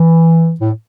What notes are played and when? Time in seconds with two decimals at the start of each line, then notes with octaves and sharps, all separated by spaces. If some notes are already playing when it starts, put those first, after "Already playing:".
Already playing: E3
0.60 A2